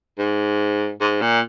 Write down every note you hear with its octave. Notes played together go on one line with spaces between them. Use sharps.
G#2
G#2
A#2